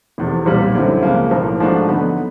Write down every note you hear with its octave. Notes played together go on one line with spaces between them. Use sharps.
F1 E2 C3
B1 A#2 G3
F#2 D3 G3 C4 E4
C#2 C#3 F3 A#3
B1 A2 F3 A#3
G#2 F3 A3 D4 F#4
F2 D3 F#3 B3 D#4